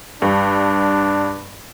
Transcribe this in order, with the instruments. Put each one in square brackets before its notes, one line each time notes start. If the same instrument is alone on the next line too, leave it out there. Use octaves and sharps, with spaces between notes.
[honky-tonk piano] G2 [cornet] D4